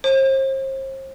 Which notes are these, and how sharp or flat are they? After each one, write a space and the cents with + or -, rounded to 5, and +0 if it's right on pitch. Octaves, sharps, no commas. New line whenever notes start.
C5 +40